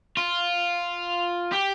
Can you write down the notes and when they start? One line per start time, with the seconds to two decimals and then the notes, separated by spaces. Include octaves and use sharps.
0.17 F4
1.52 G4